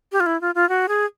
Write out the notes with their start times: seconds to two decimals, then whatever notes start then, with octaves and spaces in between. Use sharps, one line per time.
0.12 G4
0.20 F4
0.26 E4
0.41 F4
0.55 F4
0.69 F#4
0.88 G#4